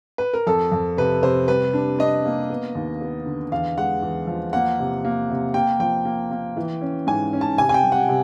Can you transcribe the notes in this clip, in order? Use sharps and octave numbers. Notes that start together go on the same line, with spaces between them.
B4
A#4
F2 A4
F2
C3 B4
C3 C5
G3 B4
D4
D4 D#5
A#3
B3
D#2
B3
D3
E2 F5
G#3 F#5
E2
F3
A#3 F#5
C3
A#3
C3
A#3 G5
F3 G5
A#3
A#3
E3
C#4
G#2 G#5
C#4
A5
C3 G#5
G#5
G5
G3
F#5
C3